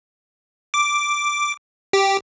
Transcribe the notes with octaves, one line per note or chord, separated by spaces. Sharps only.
D6
G4